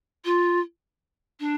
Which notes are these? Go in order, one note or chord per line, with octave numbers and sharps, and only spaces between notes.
F4
D4